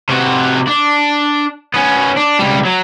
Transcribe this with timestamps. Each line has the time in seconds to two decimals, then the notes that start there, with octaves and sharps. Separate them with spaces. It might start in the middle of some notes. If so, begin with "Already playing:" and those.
0.09 C3 F#4
0.67 D4
1.74 B3 C#4
2.16 D4
2.39 C#2 G3
2.65 F#3